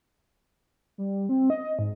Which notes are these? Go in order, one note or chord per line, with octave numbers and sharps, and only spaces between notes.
G3
C4
D#5
G#2